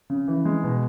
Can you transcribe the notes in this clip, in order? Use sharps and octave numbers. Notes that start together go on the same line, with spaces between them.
C#3
E3
G#3
B2